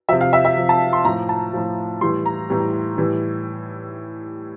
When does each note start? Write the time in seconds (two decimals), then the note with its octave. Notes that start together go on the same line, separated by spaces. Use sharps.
0.09 F3 E5
0.12 C3
0.21 F5
0.33 E5
0.45 E5
0.57 C3 F3
0.69 A5
0.93 C6
1.05 A2 A#5
1.08 F3
1.29 A5
1.53 A2 F3
2.01 A2 E3 G3 C6
2.26 A#5
2.50 A2 E3 G3
2.98 A2 E3 G3